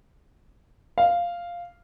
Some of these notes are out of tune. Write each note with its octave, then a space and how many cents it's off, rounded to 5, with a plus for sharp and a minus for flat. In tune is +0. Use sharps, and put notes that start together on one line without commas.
F5 -5